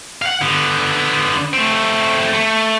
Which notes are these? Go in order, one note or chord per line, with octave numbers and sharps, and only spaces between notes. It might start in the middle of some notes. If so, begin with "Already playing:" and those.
F5 F#5
D3 B3
A3 C4
A3